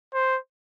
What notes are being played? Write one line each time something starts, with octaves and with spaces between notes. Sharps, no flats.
C5